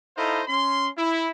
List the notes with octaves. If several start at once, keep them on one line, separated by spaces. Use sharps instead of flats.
D#4 E4 A4 C5 D#5 F5
C#4 C6
E4